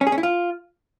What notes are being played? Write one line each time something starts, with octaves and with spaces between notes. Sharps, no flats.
C#4
G#4
C#4
E4
F4